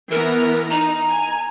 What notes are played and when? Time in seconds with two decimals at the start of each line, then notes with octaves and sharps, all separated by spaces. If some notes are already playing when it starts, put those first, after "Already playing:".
0.11 E3 B3 A#4 A#5
0.70 D#4 A#5
1.10 G#5